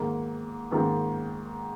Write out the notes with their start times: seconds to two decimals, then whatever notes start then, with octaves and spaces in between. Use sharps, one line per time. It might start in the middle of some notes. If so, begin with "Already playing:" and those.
Already playing: G#2 D#3 A#3
0.71 G#2 D#3 A#3